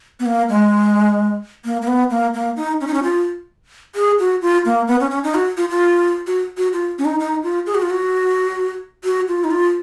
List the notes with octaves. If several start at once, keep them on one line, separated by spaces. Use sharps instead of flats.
B3
A#3
G#3
A#3
A#3
B3
A#3
A#3
D#4
C#4
D#4
C#4
F4
G#4
F#4
F4
A#3
B3
C#4
C#4
D#4
F#4
F4
F4
F#4
F#4
F4
C#4
D#4
D#4
F4
G#4
F#4
F4
F#4
F#4
F4
D#4
F4